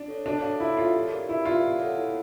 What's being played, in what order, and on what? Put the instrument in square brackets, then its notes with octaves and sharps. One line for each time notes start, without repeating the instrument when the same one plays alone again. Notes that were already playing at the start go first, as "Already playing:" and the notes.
Already playing: [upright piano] D4
[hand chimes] A4 C#5
[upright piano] D4 [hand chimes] F#4
[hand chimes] A4 C#5 F5
[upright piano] E4 [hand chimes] F#4
[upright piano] F4 [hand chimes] A4 C#5 F5
[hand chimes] G4
A#4 D5
[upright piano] E4 [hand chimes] G4
[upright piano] F4 [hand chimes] A#4 D5
[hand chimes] E4
A4 C#5 F#5
E4